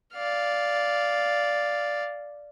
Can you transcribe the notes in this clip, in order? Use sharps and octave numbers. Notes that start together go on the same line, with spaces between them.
D5 F5